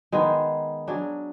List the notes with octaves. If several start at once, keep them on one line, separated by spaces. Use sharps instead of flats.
D#3 G#3 B3 D#4
F#3 D4 G#4